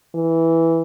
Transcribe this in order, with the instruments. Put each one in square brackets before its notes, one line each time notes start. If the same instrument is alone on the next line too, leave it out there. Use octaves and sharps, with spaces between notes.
[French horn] E3